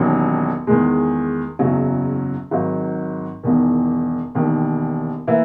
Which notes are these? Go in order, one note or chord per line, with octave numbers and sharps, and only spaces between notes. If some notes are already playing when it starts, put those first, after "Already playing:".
Already playing: E1 D#2 D#3 F#3 C#4
E2 D#3 G#3
F#1 E2 C#3 F#3
G#1 G#2 F#3
E1 E2 D#3
E1 D#2 D#3
E3 A#3 E4